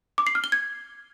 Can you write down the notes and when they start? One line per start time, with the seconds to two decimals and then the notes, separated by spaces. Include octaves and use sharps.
0.18 D6
0.27 C7
0.35 F6
0.44 G7
0.52 G#6